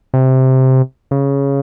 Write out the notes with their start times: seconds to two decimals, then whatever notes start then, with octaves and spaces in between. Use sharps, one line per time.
0.14 C3
1.11 C#3